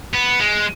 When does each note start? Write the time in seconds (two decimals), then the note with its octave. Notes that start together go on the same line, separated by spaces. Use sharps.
0.14 B3
0.40 G#3